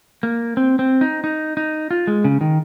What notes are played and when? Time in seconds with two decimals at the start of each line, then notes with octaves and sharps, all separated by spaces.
0.23 A#3
0.57 C4
0.79 C4
1.01 D#4
1.24 D#4
1.57 D#4
1.91 F4
2.07 G#3
2.24 C#3
2.41 D#3